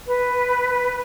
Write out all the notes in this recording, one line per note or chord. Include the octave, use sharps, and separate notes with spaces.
B4